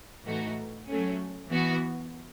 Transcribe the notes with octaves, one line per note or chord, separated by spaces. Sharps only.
A2 E3 A3 D#4 F#4
F#3 A3 C#4
E3 B3 F#4